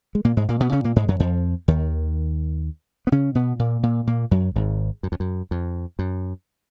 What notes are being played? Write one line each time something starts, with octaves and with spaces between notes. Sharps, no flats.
G#3
A#2 A#3
G#2 G#3
A#2 A#3
B2 B3
C#3 C#4
A#2 A#3
G#2 G#3
F#2 F#3
F2 F3
D#2 D#3
B3
C#3 C#4
B2 B3
A#2 A#3
A#2 A#3
A#2 A#3
F#2 F#3
G#1 G#2
F#2
F2
F#2
F2
F#2